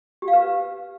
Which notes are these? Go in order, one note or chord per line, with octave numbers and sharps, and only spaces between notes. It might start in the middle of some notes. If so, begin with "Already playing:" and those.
G4
F5
B4